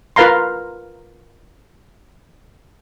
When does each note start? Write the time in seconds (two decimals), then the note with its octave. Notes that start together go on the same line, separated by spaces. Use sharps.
0.16 F4 A#4 B4 F5 A#5 C6